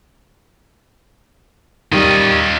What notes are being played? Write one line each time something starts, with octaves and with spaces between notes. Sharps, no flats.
D#3 G3 F4 D#5